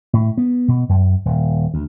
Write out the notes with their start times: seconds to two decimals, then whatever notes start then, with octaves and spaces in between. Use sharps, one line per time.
0.13 A2
0.38 B3
0.68 B2
0.89 F#2
1.25 D#1
1.74 D2